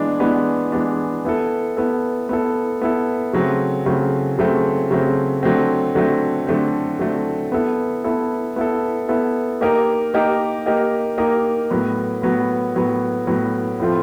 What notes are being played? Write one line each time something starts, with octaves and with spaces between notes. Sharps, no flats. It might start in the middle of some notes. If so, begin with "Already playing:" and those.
Already playing: E3 G#3 B3 D4
E3 G#3 B3 D4
E3 G#3 B3 D4
B3 E4 A4
B3 E4 A4
B3 E4 A4
B3 E4 A4
C#3 F#3 A3 C4
C#3 F#3 A3 C4
C#3 F#3 A3 C4
C#3 F#3 A3 C4
D3 F#3 A3 C4
D3 F#3 A3 C4
D3 F#3 A3 C4
D3 F#3 A3 C4
B3 E4 A4
B3 E4 A4
B3 E4 A4
B3 E4 A4
A#3 D#4 G4 A#4 D#5
A#3 D#4 G4 A#4 D#5
A#3 D#4 G4 A#4 D#5
A#3 D#4 G4 A#4 D#5
A2 F#3 B3
A2 F#3 B3
A2 F#3 B3
A2 F#3 B3
A2 F3 A3 C4 F4